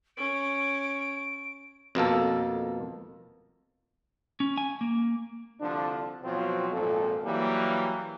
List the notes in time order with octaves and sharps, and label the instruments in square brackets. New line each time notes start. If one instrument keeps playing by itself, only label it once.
[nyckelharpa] C#4 [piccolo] D7
[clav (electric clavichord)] F2 B2 A#3 A4
[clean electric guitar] C#4
G#5
A#3
[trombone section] C2 D3 F3 D4
B2 F3 F#3 C4 F4
G#1 F2 A#2 A4
E3 F#3 G3 A#3